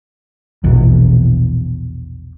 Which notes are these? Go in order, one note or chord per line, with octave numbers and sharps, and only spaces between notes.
A#1 E2 B2